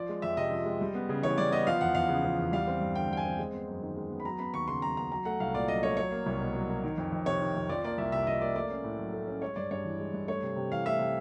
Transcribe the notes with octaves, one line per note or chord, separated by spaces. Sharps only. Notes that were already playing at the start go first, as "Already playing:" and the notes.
Already playing: F3 D5
G#3
F2 E5
C3 D#5
F3
G#3
G3
B3
C#3
E3 C#5
G3 D5
B3 D#5
F3 F5
E2 F#5
E2 F5
C#3
F3
E2
G3 F5
C4
G2
D3 G5
G3 G5
G#5
C4
G#3
B3
F#2
D#3
G#3
B3
B5
F#3 A#5
B3 B5
D#2 C#6
C#3 C6
F#3 A#5
B3 A#5
F#3 A#5
A3 F#5
C2 F5
A#2 D5
F#3 D#5
A3 C#5
F#3 C#5
A#3
C2
B2
F#3
A#3
D#3
F2
F2
C3 C#5
D#3
F2
F3 D5
A#3 D5
C2 E5
C3 E5
F3 D#5
A#3 D5
A3 D5
C#4
A2
F#3
A3
C#4
G#3 C#5
G2 D5
G2 C#5
E3
G#3
G2
A3 C#5
C3
C3
E3 F5
A3 E5
C3